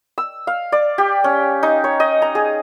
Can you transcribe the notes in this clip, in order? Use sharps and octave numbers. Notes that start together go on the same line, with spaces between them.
E6
F5
D5
G4
C#4
D#4
C#5
D#5
A#5
G#4